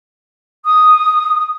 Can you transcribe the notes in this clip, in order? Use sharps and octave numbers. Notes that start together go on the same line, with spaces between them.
D#6